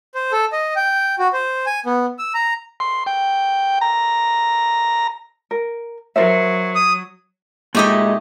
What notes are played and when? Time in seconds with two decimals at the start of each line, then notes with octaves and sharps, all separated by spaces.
0.15 C5
0.32 A4
0.52 D#5
0.76 G5
1.19 F#4
1.33 C5
1.66 G#5
1.86 B3
2.19 E6
2.34 A#5
2.80 C6
3.06 G5
3.81 A#5
5.51 A#4
6.16 F#3 A#4 C5 E5
6.75 D#6
7.75 A#2 G#3 A3 D#4 G4 D#5